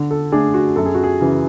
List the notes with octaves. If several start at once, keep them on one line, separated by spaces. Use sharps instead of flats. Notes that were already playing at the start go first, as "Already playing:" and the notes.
Already playing: D3
A4
A3 D4 G#4
F#4
F#2 A4
G#4
F#4
G#4
C#3 E3